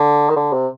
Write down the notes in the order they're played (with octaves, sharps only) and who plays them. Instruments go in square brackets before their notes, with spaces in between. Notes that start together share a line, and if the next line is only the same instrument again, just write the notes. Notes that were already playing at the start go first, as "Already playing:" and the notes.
Already playing: [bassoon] D3
D#3
D3
C3